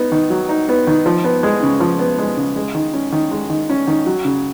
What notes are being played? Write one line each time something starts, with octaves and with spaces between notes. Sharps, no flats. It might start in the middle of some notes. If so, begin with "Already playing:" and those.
Already playing: B3 D#4
D#3
F#3
D#4
B3
D#3
F3
B3
G#3
C#3
F3
B3
G#3
C#3
G#3
D#3
C#4
D#3
G#3
D#3
C#4
D#3
F#3
C#3